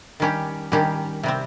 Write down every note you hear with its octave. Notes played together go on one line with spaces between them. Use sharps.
D#3 G3 C#4 G4
D#3 G3 C#4 G4
C3 G3 C4